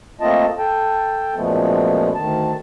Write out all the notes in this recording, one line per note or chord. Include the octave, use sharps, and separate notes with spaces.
A3 A#3 C4 F4 D#5 A5
A4 G5 A5
F#2 A#2 F3 G#3 A3 B3
D2 D#3 A5